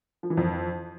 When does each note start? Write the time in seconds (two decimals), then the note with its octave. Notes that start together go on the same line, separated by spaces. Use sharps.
0.23 F3
0.30 E3
0.37 F2